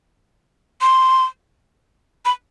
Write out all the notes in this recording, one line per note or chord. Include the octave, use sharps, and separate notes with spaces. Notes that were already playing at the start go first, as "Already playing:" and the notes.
C6
B5